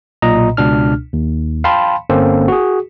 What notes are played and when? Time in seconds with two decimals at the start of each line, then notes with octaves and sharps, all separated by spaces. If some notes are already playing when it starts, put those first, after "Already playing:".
0.22 B1 A#2 D#5 A#5
0.57 C#2 B2 D4 F6
1.13 D#2
1.64 F5 G5 A5 B5 C6
2.10 G1 A#3 C4 C#4 A4 C5
2.48 F#4 G#4